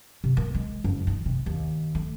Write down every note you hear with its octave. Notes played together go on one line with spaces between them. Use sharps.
C3
A#3
G#3
F#1
D#3
C3
D#2
A3